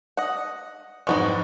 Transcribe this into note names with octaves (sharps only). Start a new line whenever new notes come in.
D#5 F#5
F2 G#2 F3 G#3 F#4 B4 D#5 C#6